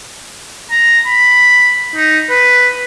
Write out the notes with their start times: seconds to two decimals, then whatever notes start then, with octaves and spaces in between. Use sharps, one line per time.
0.71 A#5
1.06 B5
1.96 D#4
2.30 B4